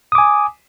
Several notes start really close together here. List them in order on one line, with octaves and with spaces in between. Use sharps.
D#6 D6 G#5